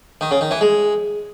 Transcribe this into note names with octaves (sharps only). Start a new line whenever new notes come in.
D#3
C#3
D#3
E3
G#3